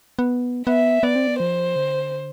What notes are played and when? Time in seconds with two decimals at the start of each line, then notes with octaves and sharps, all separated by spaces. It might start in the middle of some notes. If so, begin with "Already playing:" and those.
0.19 B3
0.67 B3 E5
1.03 B3 D5
1.16 C4
1.27 B3
1.39 F3 C5
1.76 D3